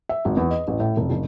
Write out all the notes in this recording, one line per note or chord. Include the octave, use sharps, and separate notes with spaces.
E5
G#1
E2
D#5
A1
A2
F1
F#1